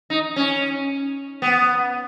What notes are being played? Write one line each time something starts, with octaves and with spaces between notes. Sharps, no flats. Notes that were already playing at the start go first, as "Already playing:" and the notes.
D#4
C#4
B3